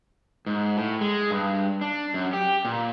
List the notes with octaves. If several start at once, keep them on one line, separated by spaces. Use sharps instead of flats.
G#2
A2
G#3
G2
D4
F#2
G4
A#2